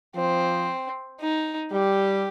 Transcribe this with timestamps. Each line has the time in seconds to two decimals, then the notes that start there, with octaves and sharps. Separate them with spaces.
0.16 F3 C4
1.20 D#4
1.72 G3 G4